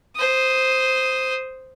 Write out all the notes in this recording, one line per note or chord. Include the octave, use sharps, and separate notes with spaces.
C5 D#6